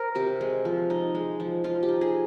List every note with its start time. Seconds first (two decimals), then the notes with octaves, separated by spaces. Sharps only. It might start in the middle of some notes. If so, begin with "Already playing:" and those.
Already playing: A#4 C5
0.15 C3 G4
0.41 G#3
0.65 F3
0.90 D#4
1.15 G#3
1.40 F3
1.64 F3 F4
1.83 G4
1.89 D#4
2.01 G#4